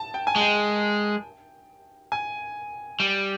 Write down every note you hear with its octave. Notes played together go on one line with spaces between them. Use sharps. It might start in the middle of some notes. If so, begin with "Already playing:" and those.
Already playing: A5
G5
G#5
G#3
G5
G#5
G3